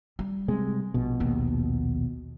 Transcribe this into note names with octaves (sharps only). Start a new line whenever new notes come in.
G3
C3 G#3
A#1 B2
D#2 D#3